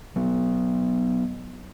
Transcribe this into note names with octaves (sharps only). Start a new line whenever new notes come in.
F#3 B3